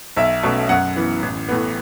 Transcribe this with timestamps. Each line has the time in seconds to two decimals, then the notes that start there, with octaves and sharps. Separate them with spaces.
0.17 B1 E5
0.43 B2 A3 C#4
0.69 F#2 F#5
0.96 E3 B3
1.22 A1
1.48 A2 E3 B3